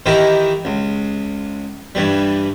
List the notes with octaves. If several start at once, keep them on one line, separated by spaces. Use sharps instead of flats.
D#3 E3 D#4 E4 G4 A#4
C#2
G2 E3 G3